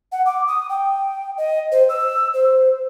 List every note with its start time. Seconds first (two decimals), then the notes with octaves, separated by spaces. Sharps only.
0.12 F#5
0.26 D6
0.48 D#6
0.69 G5
1.38 D#5
1.72 C5
1.89 E6
2.34 C5